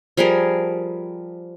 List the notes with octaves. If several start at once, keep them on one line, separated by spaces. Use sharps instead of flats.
F3 G3 G#4 A#4